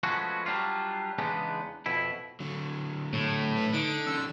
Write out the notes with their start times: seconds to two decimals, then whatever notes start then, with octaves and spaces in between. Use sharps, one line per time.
0.03 F3 G#3 A3 B3 C#4 F#4
0.46 F#3 G3 D4 F4
1.19 E2 C#3 G#3 B3 D4 D#4
1.86 F2 B2 E4
2.40 D3 F#3
3.13 A2 A3
3.57 E4 B4
3.73 D3 D#4 D7
4.07 D#3 C#4 E6